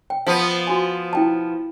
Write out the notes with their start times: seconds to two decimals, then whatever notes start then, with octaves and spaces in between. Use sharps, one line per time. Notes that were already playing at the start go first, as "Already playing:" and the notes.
0.10 G5
0.26 F3 B3
0.67 F#4 G#5
1.13 E4 G5 A5